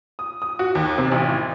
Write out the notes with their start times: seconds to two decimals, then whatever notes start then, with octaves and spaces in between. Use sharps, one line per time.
0.19 D#6
0.42 D#6
0.59 F#4
0.75 D#2
0.98 C3
1.12 A1
1.29 G#1